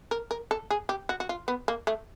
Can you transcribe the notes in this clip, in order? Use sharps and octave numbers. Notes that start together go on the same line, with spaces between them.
A#4
A#4
A4
G#4
G4
F#4
F#4
F4
B3
A#3
A3